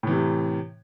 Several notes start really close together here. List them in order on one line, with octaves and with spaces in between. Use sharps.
A2 E3 C3